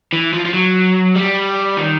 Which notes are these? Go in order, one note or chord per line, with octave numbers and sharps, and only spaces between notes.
E3
F3
F3
F#3
G3
D#3